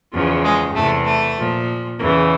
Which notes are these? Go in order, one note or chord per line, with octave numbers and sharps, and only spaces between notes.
E2 C#3 F3
G#3
E2 C3 E3 A3
A3
A#2 F3
E2 C#3 E3 A#3